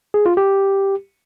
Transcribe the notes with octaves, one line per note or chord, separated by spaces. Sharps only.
G#4
F4
G4